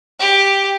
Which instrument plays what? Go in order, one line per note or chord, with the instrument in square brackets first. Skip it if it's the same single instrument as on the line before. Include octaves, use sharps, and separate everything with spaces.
[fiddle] G4